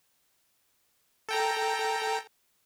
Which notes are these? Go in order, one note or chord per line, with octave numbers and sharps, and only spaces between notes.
A4 G5 A#5